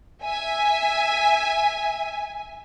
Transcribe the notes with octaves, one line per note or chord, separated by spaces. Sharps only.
E5 G#5